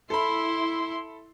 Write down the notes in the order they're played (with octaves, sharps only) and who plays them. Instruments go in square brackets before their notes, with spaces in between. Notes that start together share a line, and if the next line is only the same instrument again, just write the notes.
[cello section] E4 [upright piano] A4 B5 [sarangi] C6